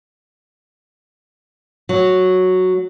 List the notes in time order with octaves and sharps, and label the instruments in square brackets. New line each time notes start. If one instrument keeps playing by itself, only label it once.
[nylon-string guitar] F#3